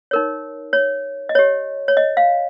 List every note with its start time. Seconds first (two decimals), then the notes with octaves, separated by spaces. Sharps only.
0.11 D#4 A#4 C#5
0.73 C#5
1.29 D#5
1.35 G4 C#5
1.88 C#5
1.97 D#5
2.17 F5